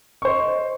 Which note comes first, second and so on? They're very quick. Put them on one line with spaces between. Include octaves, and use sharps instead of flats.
C#6 C5 D#5